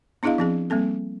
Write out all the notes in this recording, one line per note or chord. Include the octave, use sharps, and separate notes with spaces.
B3 D4 E4 G#4 D#5 F5
F3 C4 G#4
G3 A#3 C4 A4